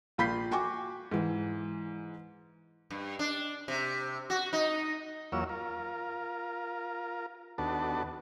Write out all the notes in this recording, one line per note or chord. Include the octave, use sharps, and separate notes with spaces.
A#1 F4 B5 G6 B6 C7
F#4 G5 G#5 C#6 D6
G#2 E3
G2
D4
C3
F#4
D#4
E2 F#3 A#3 F4 C#5 E6
F4 A#4
D#2 B3 D4 F#4 A4 A5